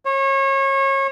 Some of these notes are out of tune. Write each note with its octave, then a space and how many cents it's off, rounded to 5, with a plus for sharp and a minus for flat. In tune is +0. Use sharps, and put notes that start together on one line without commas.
C#5 -30